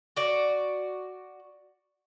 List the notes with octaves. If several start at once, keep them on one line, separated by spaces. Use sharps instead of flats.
F#4 D5